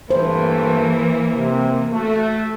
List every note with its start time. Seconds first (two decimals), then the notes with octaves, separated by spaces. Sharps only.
0.10 G2 E3 A3 A#3 B4 C5
1.35 C3
1.93 A3 F#4